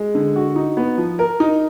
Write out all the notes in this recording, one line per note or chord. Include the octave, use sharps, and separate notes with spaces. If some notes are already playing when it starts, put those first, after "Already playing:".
Already playing: G#3
D3
F#4
D#4
B3
F3
A#4
D#4